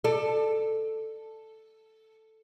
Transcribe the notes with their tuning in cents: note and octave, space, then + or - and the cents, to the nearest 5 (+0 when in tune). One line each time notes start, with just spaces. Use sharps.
A4 +0 D5 +25